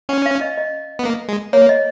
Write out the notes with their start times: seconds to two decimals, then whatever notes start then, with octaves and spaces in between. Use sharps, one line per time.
0.09 C#4 F#5
0.26 F5
0.41 D#5
0.58 D#5
0.99 B3
1.05 A#3
1.28 G#3
1.53 A#3 C#5
1.69 D#5